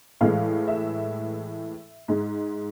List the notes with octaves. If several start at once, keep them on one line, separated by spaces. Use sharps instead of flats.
A2 E3 G#3 F5
E5
G#2 G#3